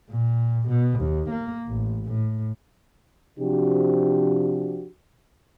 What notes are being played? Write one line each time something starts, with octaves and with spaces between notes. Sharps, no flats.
A#2
B2
D#2
A#3
A1
A2
C3 F3 D4 F#4 G4